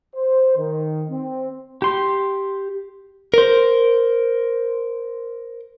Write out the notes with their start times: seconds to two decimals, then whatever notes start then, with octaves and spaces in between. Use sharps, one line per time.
0.15 C5
0.57 D#3
1.10 C4
1.82 G4 C6
3.34 A#4 C5